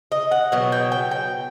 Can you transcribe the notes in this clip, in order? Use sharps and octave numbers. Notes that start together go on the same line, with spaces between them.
D#5
F#5
B2 F#3
G5
G5
G5